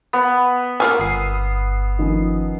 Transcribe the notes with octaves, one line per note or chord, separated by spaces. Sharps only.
B3
A#3 F4 G#5 B5 E6 F6
G1 D#6 C7
D#3 F3 C#4